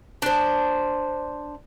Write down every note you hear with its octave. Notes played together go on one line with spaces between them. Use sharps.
D4 C5